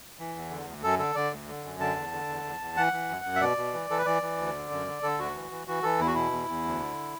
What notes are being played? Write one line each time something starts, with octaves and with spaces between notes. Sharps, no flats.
E3
E2
D3
D2
F#2 A4
D3 A4
D3 D5
D2
D3
F#2
D3 A5
E2
D3
E2
E2
E2
E3 F#5
E3
F#2
F#2
E5
B2 D5
B2
E3
E3 A4
B4
E3 D5
E3
D2
D3
F#2
D3
D3 A4
D2 F#4
E3
E3
E3 F#4
E3 A4
E2 E4
F#4
B2 E4
E2
E2
D2
D3